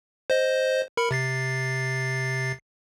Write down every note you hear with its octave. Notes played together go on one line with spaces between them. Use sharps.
C5 D#5
A#4 B5 C#7
C3 A6 C7